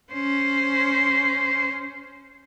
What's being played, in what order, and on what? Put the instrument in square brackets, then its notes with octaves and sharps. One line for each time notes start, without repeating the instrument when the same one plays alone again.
[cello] C#4 C5